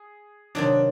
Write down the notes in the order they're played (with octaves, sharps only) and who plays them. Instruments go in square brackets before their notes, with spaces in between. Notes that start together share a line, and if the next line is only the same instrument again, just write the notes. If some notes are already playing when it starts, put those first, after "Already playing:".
Already playing: [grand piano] G#4
[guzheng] C3 D#3 F#3 [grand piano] D4